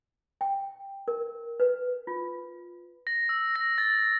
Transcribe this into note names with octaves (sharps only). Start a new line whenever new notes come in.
G5
A#4
B4
F4
A#6
E6
A#6
A6